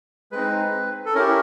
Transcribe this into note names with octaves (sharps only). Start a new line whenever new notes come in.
G#3 C4 D#4 B4
A4
C#4 E4 G4 A#4